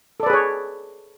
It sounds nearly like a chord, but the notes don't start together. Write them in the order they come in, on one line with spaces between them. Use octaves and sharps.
A4 D5 B4 G#4 C#5